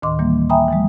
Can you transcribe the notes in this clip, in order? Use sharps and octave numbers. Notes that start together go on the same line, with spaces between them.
D2 A2 D#3 D#5 C6 D6
E3 G3 A#3
E5 G5 G#5 A#5 B5 D#6
E3 F#3 G#3